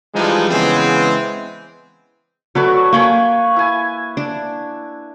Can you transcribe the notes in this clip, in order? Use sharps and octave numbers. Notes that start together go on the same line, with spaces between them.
E3 F3 G3 G#3 D4 D#4
C#3 E3 G#3 B3 C4
F#3 A3 F#4 B4 C#5 D5
A#3 G5 G#5 B5 C#6
E4 G#5
D4